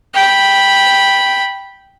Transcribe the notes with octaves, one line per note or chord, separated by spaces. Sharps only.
G5 B5